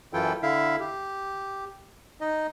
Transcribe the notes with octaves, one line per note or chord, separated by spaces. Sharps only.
F#2 E3 E4 F4 A4 G5
D3 E4 E5 F5
G4
D#4 D#5